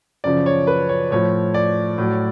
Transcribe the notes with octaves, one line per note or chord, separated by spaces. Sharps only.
F#2 C#3 F3 D5
C#5
B4
C#5
A2 F3 C#5
D5
A2 F#3